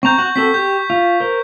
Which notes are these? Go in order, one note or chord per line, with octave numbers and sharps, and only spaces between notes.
C4 A#5 C#6 G6
F#4
C4 F#4 A4 B6
G4 G6
F4
A#4 C5